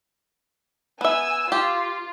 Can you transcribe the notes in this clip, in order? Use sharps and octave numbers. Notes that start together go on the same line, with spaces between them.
B3 E5 G#5 E6
F4 G4